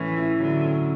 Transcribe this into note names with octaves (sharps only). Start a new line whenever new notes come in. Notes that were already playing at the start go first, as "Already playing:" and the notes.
Already playing: A2 E3 C#4
E4
D3 F#3
C#4